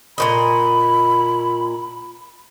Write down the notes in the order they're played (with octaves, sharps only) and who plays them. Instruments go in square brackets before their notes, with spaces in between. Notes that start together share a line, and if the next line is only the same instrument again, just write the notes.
[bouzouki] A#2 D#3 D#5 [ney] B5